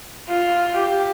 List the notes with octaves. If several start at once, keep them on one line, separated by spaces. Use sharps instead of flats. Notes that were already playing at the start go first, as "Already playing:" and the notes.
F4
G4